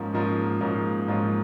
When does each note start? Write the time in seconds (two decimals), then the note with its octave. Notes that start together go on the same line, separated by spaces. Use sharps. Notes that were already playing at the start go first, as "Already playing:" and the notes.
Already playing: G#2 F3 A#3 C#4 F4
0.13 G#2 F3 A#3 C#4 F4
0.61 G#2 F3 A#3 C#4 F4
1.08 G#2 F3 A#3 C#4 F4